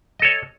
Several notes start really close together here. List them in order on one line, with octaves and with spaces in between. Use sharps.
D#5 A4 C#5